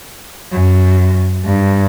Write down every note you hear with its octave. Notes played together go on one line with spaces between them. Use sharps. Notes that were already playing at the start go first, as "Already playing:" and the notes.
F#2
G2